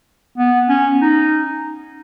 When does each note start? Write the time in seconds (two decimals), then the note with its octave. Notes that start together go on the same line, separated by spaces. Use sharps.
0.38 B3
0.69 C#4
1.02 D#4